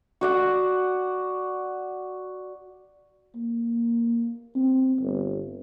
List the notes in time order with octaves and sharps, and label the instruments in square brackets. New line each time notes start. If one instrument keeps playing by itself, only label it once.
[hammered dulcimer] F#4 D5 F#5
[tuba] A#3
C4
G1